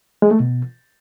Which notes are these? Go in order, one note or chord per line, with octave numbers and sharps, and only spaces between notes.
G#3
A3
B2